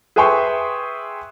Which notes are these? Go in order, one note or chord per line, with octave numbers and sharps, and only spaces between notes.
G#4 B4 E5 G5 C6 C#6